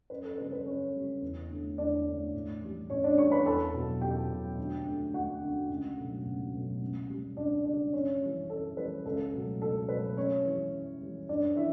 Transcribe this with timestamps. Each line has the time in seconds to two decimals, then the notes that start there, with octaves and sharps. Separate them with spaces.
0.10 F#2 B4
0.24 A4
0.38 C#3 G3 B4
0.52 B4
0.65 F#2 C#4 C#5
0.94 C#3 G3
1.22 E2
1.50 D3 A3
1.78 E2 D4 D5
2.06 D3 A3
2.34 A2
2.62 E3 G3
2.90 A2 C#4 C#5
3.04 D4 D5
3.18 E3 G3 C#5 C#6
3.32 B4 B5
3.46 E2 A4 A5
3.74 B2 F#3
4.01 E2 G4 G5
4.29 B2 F#3
4.58 D2
4.86 D3 A3
5.13 D2 F#4 F#5
5.42 D3 A3
5.70 C#2
5.97 B2 F#3 A3
6.25 C#2
6.54 B2 F#3 A3
6.81 C#2
7.09 C#3 G3
7.37 C#2 D4 D5
7.65 C#3 G3 D4 D5
7.93 F#2 C#4 C#5
8.21 E3 G3
8.50 F#2 A4
8.77 E3 G3 B4
9.05 C#2 A4
9.33 B2 F#3 A3
9.62 C#2 A4
9.89 B2 F#3 A3 B4
10.16 F#2 C#4 C#5
10.45 E3 G3
10.72 F#2
11.01 E3 G3
11.29 G2 D4 D5
11.56 E3 E4 E5